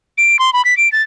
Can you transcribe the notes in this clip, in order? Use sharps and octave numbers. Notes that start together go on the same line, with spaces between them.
D7
C6
B5
B6
D7
A6